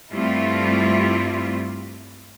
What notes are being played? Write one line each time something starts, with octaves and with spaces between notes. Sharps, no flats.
G2 G3 A3 C4 E4 F4